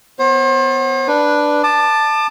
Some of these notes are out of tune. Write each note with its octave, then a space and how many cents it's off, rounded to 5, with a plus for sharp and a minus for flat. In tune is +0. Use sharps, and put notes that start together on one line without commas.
B3 +15 C5 +40
D4 +0 B4 -10
A5 +0 D6 +35